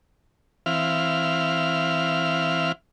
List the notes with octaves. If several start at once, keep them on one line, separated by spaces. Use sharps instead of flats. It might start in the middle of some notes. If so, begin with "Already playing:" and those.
E3 C4 E4 F5 F6